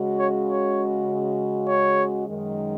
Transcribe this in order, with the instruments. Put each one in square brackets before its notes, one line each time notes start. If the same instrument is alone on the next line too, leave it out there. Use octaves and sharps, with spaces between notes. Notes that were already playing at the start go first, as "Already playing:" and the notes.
Already playing: [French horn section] C#3 G#3 F#4
[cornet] C#5
C#5
C#5
[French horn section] F#2 D#3 G#3